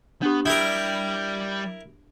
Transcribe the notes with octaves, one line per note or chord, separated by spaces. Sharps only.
B3 D4 G4
G3 E4 A#4 G5 D#6 E6